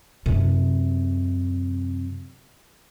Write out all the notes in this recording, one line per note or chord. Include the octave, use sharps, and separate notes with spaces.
F#2 C3